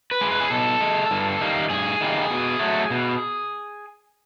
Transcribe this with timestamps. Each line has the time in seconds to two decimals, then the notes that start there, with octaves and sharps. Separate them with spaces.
0.11 B4
0.21 G#3
0.31 B4
0.40 G#4
0.50 B2 A4
0.81 G#3
1.11 G2
1.41 D#3 G3 A#3
1.70 G2 G#4
2.01 D#3 G3 A#3
2.30 B2
2.59 F#3 A3
2.90 B2